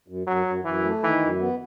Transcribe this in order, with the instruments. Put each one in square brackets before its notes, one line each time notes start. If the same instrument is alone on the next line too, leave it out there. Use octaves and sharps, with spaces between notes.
[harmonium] F#2
[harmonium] F#2 [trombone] F#3
[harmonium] F#2
[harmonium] F#2 [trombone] E3
[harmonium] A3
[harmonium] D#3 [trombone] E3
[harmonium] F#2
B3